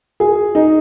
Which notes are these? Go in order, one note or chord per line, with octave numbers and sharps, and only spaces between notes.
G#4
D#4